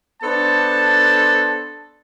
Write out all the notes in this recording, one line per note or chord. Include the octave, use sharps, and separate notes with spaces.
B3 D4 A4 C5 A5